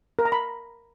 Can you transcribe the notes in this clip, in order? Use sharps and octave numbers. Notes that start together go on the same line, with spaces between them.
A#4
A#5
B5